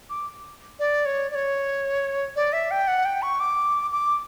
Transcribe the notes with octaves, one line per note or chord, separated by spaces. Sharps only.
D6
D5
C#5
D5
C#5
D5
E5
G5
F#5
G5
C#6
D6
D6